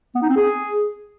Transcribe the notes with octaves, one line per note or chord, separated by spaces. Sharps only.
B3
D#4
C4
G#4